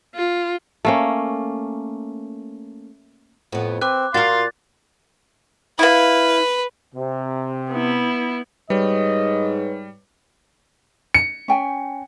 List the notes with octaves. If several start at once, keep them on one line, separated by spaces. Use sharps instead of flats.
F4
A3 A#3 C#4
F2 A2 B3
C4 B4 D6 F#6
A#2 F#4 A#4 F5 C6 A6
E4 B4 F5
C3
B3 E4
G#2 G3 B4 C#5 D#5
C#7
C#4 G5 G#5